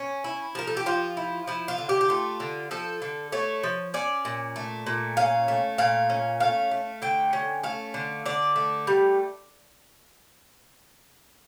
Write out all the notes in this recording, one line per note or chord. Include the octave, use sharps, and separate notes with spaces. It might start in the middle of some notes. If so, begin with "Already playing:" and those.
Already playing: C#4
E4
F3 A#4
A4
G4
F3 F4
E4
F3 E4
F4
D3
G4
G4
A3 F4
D3
F3 A4
D3
A3 C#5
F3
C#4 D5
A#2
A3
A#2
C#4 F5
A3
A#2 F5
C#4
A3 F5
A3
D3 G5
C#4
A3 F5
D3
D3 D5
A3
G3